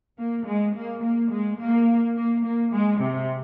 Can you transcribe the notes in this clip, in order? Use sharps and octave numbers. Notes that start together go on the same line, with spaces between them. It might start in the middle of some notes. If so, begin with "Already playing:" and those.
A#3
G#3
A#3
A#3
G#3
A#3
A#3
A#3
G#3
C3